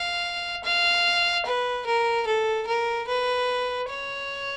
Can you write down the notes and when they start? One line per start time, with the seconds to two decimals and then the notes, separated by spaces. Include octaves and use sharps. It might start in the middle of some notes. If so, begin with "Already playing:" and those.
Already playing: F5
0.64 F5
1.45 B4
1.86 A#4
2.26 A4
2.67 A#4
3.08 B4
3.89 C#5